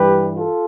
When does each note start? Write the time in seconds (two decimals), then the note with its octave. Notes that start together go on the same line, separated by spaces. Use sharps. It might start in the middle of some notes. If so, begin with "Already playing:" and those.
Already playing: G2 E3 G3 G4 B4
0.36 F4 A4